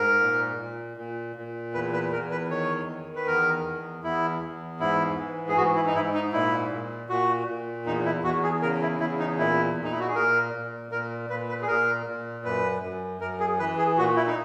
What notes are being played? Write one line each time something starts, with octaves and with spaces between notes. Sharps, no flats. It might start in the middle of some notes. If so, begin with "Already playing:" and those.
Already playing: G#2 A#4
A#2
A#2
A#2
A#2
E2 B4
B4
E2 A#4
B4
D#3 C#5
D#3
B4
E2 A#4
E2
E2 E4
E2
G#2 E4
E3
G#4
G#2 F#4
E4
D#4
G#2 E4
D#4
A#2 E4
A#2
A#2 F#4
A#2
E2 D#4
E4
E2 F#4
G#4
C#3 A#4
E4
E2 E4
D#4
A#2 E4
A#2
D#4
E4
F#4
G#4
A#2 A#4
A#2
A#2 A#4
A#2 B4
B4
G#4
A#2 A#4
A#2
F#2 B4
F#2
F#2 A#4
G#4
E3 B4
G#4
A#2 F#4
E4
D#4